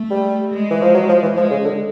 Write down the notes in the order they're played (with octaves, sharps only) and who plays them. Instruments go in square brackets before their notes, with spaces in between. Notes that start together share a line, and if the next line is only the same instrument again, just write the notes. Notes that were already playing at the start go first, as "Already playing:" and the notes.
Already playing: [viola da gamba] A3
[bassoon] G3
[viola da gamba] G#3
[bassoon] E3
F3
F#3
F3
E3
[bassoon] F3 [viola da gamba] G#3
[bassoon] C#3
D3